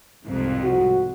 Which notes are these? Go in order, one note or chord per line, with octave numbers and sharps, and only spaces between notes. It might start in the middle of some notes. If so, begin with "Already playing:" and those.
C2 F2 G#2
F#4